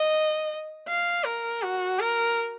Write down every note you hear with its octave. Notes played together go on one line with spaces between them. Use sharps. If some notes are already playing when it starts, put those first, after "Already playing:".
Already playing: D#5
F5
A#4
F#4
A#4